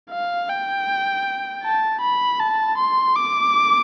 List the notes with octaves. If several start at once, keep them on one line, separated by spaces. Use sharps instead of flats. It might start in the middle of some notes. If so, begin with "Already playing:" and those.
F5
G5
A5
B5
A5
C6
D6